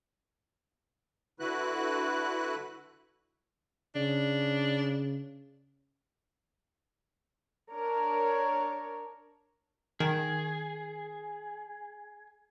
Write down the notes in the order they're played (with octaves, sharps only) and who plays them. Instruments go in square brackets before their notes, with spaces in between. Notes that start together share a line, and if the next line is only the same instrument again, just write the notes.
[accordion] D3 E4 F#4 B4 F#6
[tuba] C#3 [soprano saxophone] D4
[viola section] D4 A#4 C#5
[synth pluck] D#3 [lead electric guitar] G#4